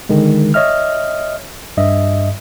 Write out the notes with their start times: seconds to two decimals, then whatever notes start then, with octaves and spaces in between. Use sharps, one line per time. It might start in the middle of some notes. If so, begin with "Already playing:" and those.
0.09 D3 D#3 G#3
0.54 C#5 D#5 E5 F6
1.77 G2 D#5 E5